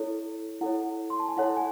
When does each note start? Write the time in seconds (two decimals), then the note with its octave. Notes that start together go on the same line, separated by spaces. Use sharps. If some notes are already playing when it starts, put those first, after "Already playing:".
Already playing: E4 A4 C#5
0.61 E4 A4 C#5 F#5
1.10 C6
1.20 A5
1.29 G#5
1.37 E4 A4 C#5 F#5
1.57 G#5